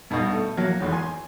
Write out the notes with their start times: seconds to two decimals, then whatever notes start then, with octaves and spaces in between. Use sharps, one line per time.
0.10 G2 B2 D#4 F#4
0.33 A3
0.57 F#3 A#3 C#5
0.80 G#1 E2
0.92 G#5 C6